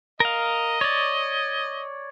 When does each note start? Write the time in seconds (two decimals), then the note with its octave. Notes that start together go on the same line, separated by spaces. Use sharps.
0.20 A#4 D#5 F5
0.81 C#5 D5